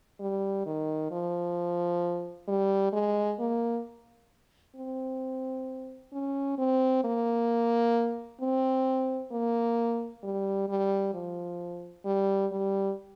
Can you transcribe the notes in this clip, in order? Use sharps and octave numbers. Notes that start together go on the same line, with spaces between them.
G3
D#3
F3
G3
G#3
A#3
C4
C#4
C4
A#3
C4
A#3
G3
G3
F3
G3
G3